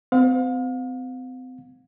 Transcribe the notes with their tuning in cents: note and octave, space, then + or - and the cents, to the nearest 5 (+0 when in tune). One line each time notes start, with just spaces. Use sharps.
C4 -40 F5 +40